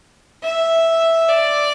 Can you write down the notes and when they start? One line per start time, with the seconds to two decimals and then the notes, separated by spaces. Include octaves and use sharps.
0.42 E5
1.28 D5